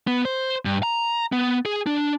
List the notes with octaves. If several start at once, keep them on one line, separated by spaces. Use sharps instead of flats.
B3
C5
G2
A#5
B3
G#4
D4